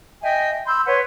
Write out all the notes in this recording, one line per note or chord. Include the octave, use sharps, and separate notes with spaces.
D#5 E5 G5 G#5
B5 C6 E6 G6
B4 C#5 F#5 C6